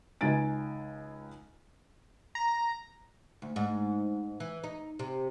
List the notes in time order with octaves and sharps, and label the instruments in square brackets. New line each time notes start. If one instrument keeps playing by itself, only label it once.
[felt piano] C#2 D#4 G#5 A6 D7
[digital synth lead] A#5
[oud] D2
G#2
E3
D#4
C3